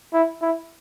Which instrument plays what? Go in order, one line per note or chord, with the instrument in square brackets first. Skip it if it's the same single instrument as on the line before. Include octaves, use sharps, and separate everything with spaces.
[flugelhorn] E4
E4